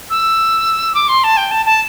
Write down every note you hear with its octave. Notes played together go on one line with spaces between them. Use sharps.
E6
D6
C6
A5
G5
A5
A5